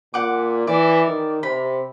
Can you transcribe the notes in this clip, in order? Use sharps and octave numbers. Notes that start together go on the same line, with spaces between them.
A#2 F#5 D6
E3 D5
D#3
C3 B5